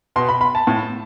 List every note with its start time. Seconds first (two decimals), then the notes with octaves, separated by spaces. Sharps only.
0.16 B2 C6
0.29 B5
0.41 B5
0.55 A5
0.67 A2